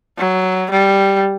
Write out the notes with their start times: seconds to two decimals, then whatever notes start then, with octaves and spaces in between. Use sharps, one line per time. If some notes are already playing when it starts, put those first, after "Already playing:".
0.18 F#3
0.70 G3